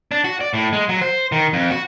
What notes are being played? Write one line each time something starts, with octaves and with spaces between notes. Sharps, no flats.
D4
F#4
D5
A2
G#3
F#3
C5
D#3
F2
F#4